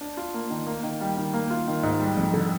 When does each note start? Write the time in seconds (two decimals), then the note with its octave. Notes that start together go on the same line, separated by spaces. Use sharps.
0.01 D4
0.17 F4
0.34 A#3
0.50 D#3
0.67 A#3
0.83 D#3
1.01 G3
1.17 D#3
1.34 A#3
1.51 F4
1.67 D#3
1.83 G#2
2.00 G3
2.17 F2
2.34 D3